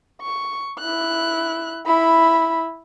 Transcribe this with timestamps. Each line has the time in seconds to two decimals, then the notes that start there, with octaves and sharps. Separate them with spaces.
0.22 C#6
0.79 E4 F#6
1.86 E4 B5